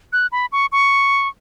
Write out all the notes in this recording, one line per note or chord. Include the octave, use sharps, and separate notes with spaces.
F#6
B5
C#6
C#6